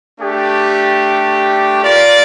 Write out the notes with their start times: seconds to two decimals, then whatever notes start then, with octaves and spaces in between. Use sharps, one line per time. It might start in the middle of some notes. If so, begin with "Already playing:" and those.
0.19 A3 D4 G4
1.83 F4 A#4 D5